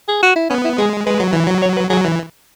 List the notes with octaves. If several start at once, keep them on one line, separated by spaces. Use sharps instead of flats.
G#4
F#4
E4
B3 C#4
E4
G#3 G#4
G#3 B4
F#3
E3
F#3
C#5
B4
F#3 G#4
E3